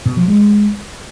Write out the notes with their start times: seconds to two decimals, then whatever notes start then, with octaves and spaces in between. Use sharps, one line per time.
0.06 B2
0.17 F3
0.28 G#3